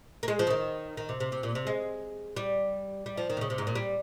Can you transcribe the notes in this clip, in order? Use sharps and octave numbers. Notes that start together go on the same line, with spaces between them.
A#3
G#3
F3
C#3
D#3
D#3
C3
C3
C3
A#2
C3
G#3
G3
G3
F3
D#3
C3
C#3
C3
G#2
A#2
G3